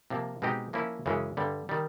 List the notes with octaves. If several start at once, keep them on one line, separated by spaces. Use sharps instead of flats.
C3 F3 A#3
B2 G#3 C4 D#4 G4
F3 A#3 C#4 E4
F#2 C#3 E3 G#3 C#4
G2 D3 G3
D#3 G3